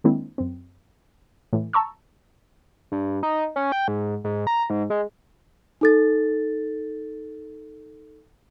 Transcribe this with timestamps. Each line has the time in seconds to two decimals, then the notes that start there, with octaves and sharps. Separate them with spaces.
0.04 D#3 G#3 A#3 C4 D4 E4
0.38 F#2 C4
1.53 A2 E3
1.73 A5 A#5 C#6 E6
2.92 G2
3.23 D#4
3.56 C#4
3.72 G5
3.88 G#2
4.24 G#2
4.47 A#5
4.70 G#2
4.90 G#3
5.81 D#4 A4 A6